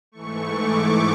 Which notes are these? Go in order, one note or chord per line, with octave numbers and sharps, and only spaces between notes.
G#2 E3 A3 C#6
D6